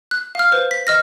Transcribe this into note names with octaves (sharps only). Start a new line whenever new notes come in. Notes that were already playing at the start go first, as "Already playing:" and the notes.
F#6
F5 F6
B4 C5
B6
D#5 F6 A#6